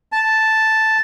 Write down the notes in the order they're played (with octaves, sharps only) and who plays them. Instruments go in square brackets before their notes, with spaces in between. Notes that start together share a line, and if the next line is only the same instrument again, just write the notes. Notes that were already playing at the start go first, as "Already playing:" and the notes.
[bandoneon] A5